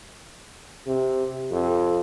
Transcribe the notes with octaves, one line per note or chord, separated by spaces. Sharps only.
C3
F2